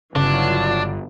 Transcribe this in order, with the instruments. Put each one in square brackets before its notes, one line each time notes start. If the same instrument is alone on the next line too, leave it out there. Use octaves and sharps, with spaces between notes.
[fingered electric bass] G1 [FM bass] C#3 [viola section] E3 F#3 F4 [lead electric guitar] D4